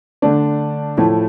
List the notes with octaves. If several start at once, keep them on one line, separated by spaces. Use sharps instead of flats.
D3 A3 D4
A2 F3 A3 E4